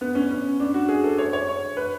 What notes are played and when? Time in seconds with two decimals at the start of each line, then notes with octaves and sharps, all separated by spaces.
0.01 B3
0.15 C#4
0.31 C#4
0.60 D4
0.74 F#4
0.88 G#4
1.04 A4
1.18 C#5
1.33 C#5
1.48 C#5
1.77 B4